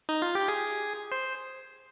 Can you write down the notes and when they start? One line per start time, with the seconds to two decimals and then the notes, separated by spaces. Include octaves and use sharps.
0.09 D#4
0.22 F4
0.35 G4
0.48 G#4
1.12 C5